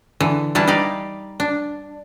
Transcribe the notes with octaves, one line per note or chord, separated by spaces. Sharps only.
D3 E3
E3 G3 D4 E4 A5
D#4 G4 D5 F5
D4